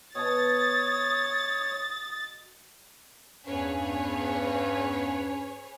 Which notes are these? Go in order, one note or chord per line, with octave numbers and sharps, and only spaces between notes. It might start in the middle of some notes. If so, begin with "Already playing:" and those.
B2 C#5 A5 D#6 A6
E2 G2 C#4 G#4 B4 C#5